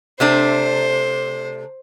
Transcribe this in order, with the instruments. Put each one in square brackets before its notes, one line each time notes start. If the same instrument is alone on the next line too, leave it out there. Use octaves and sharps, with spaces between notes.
[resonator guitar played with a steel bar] C3 A3 D4 [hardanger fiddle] C5